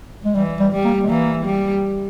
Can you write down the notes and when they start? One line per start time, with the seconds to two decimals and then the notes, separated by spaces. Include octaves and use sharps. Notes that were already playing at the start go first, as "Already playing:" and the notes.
0.25 G#3
0.35 E3 G3
0.60 G3
0.73 G3
0.85 A#3
1.04 G#3
1.09 E3 A#3
1.46 G3